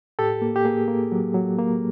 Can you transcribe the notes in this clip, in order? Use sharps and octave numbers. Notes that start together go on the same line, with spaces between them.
A2 G4 A4
A#3
G4
A#3 G#4
A#3
F#3
F#3
A#3